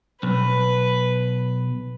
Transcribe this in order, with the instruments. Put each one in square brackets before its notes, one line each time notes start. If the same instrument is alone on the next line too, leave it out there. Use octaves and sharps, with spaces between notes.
[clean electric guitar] B1 [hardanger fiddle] B4